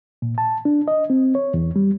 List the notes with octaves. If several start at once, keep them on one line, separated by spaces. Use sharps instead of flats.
A#2
A5
D4
D#5
C4
C#5
E2
G3